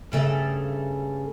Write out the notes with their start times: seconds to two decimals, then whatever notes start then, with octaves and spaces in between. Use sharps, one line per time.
0.12 G2 C#3 A3